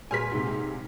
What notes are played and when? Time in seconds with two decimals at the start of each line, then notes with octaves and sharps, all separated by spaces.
0.11 A#2 G#4 B4 G#5 F6 B6
0.31 G#2 C3